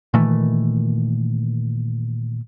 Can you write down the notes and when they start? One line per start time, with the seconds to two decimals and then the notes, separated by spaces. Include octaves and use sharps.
0.14 A#2 D#3 E3 A3